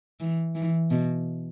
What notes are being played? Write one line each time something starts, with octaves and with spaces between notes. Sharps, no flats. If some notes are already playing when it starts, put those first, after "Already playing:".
E3
E3
B2